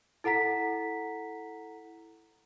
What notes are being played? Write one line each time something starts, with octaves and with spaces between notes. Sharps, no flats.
E4 A4 F#5 A#5 B6